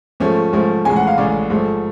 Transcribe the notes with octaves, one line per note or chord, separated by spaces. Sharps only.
G#2 F3 A3 C#4
G#2 F3 A3 C#4
A1 A2 G#3 C#4 G#5
F#5
F5
A1 A2 G#3 C#4 D5
G#2 F3 A3